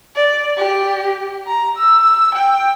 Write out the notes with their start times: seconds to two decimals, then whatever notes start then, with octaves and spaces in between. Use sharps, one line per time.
0.16 D5
0.57 G4
1.47 A#5
1.77 E6
2.35 G5